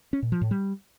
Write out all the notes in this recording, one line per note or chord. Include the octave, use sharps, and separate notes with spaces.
C#4
A#2
F3
A2
G3